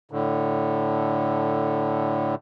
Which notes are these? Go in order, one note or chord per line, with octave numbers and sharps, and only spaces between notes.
A2 D3